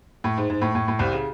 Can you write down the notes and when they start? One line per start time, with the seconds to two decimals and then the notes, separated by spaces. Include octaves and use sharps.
0.24 A2
0.37 G#2
0.50 G#2
0.62 A2
0.75 A2
0.88 A2
0.99 C2 C3
1.13 C#3